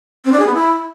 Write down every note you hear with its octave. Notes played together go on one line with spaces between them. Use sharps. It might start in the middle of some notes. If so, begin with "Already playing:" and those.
C4
D4
G#4
B3
E4